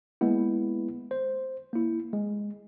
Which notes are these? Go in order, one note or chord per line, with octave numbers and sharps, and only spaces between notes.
G#3 A#3 B3 E4
C5
A#3 E4
G#3